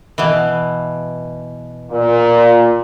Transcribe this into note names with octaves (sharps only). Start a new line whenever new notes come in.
B2 E3
A#2